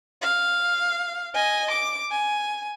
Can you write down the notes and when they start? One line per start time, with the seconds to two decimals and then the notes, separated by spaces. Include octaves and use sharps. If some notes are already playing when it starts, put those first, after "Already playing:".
0.22 F5
1.34 D#5 G#5
1.70 D6
2.11 G#5